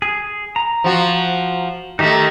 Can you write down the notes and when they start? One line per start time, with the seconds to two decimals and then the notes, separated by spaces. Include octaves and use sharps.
0.02 G#4
0.56 A#5
0.84 F3 F#4
1.99 D#3 A3 D#4 G4 E5